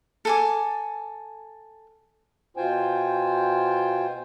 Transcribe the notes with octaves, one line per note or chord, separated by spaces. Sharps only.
A4 G#5 D6
B2 F4 C5 G5 G#5